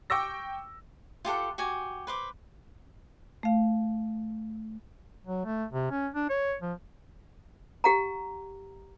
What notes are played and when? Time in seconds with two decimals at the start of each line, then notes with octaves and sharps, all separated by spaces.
0.10 G5 C#6 D6 E6 A#6
1.25 F4 G4 A4 F#5
1.58 F#4 G4 G#5
2.07 B4 C5 D6
3.43 A3 F5
5.27 F#3
5.45 A3
5.72 C3
5.91 C#4
6.14 D4
6.29 C#5
6.62 F3
7.84 G4 F#5 A#5